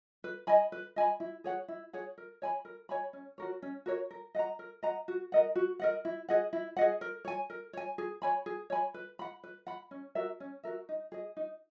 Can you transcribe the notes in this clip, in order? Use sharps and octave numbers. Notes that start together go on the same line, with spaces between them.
B4
D#5 G#5 B5
B4
D#5 G#5 B5
E4
G#4 C#5 F#5
E4
G#4 C#5 F#5
A#4
C#5 G#5 B5
A#4
C#5 G#5 B5
C#4
F#4 A#4 C#5
C#4
F#4 A#4 C#5
A#4
D#5 F#5 A#5
A#4
D#5 F#5 A#5
F#4
A#4 D#5 F#5
F#4
A#4 D#5 F#5
E4
G#4 D#5 F#5
E4
G#4 D#5 F#5
A#4
C#5 G#5
A#4
C#5 G#5
G#4
C#5 G#5 B5
G#4
C#5 G#5 B5
B4
F#5 B5
B4
F#5 B5
C#4
F#4 A#4 E5
C#4
F#4 A#4 E5
D#4
G#4 D#5
D#4